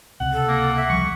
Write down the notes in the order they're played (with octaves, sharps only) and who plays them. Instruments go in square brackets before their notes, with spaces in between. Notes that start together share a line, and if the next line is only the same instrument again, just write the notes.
[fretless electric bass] C#2 C3 [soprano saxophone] F#5
[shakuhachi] A4
[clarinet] A#3
[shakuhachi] E5
[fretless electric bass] C#2 F3 G3 [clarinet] C#6